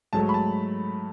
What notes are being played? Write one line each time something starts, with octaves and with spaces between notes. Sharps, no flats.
G#2 F#3 A3 A5
B5
A5